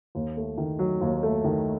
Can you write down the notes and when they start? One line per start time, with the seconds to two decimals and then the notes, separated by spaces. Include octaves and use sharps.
0.15 D#2
0.37 A3
0.58 D#3
0.79 F#3
1.01 D#2
1.23 A3
1.44 D#3